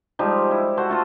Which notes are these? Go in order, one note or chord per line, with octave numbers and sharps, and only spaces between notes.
F3 G3 G#3 D#4
E4
F#4 A4 C5
A3 F4 A4